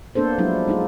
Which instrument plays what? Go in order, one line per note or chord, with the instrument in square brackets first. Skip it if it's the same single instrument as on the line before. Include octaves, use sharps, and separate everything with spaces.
[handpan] A#3 B3 D4 A4 C5
F3 F#3 G#3 D4 E4
G#3 D#4 F4